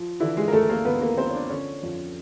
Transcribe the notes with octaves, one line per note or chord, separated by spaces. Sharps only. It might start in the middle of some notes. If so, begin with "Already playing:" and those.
Already playing: F3
D3 E3 E4
G#3 G#4
A#4
D2 A3 A4
A#3 A#4
D2 B3 B4
A#3 A#4
F3 C4 C5
C#5
D4 D5
D3 C#4 C#5
F2